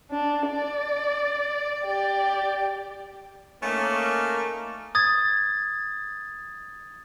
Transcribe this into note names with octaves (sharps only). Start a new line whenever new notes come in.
D4
D5
G4 D5
A3 A#3 C#4 D#4
D#6 G#6 A6